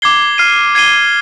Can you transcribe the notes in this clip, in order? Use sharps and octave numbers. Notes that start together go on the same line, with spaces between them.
D6 G#6 C7 G7
F6 C7 D#7
G#6 C7 D#7 G7